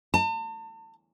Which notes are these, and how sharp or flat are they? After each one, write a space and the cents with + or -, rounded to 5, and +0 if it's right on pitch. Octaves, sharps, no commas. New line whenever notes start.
A5 +40